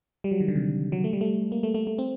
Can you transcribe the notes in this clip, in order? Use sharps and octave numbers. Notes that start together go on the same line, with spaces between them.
G3
F#3
D#3
D3
C3
F#3
A3
G3
A3
A#3
A3
A3
A3
C4